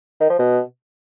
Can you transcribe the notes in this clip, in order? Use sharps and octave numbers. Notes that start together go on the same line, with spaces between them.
D#3
F3
B2